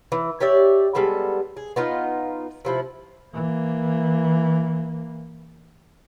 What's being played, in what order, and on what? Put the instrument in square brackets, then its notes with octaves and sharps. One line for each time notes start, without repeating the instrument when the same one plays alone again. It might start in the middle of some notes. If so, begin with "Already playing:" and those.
[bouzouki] E3
G4 C#5 D5 E5
G3 G#3 B3 A4
G#4
B3 D#4 F4
C3 F3 E4
[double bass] E3 A#3